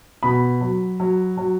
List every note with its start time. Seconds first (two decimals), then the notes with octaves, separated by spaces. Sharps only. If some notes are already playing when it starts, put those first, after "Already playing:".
0.23 B2 B5
0.61 F#3
1.00 F#3
1.37 F#3